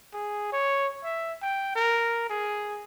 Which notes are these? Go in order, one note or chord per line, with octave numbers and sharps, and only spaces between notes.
G#4
C#5
E5
G5
A#4
G#4